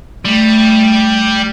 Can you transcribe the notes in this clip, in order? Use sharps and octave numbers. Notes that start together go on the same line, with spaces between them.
G3 A3